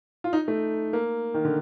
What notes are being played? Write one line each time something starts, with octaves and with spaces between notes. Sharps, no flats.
F4
D#4
A3
A#3
D#3
D3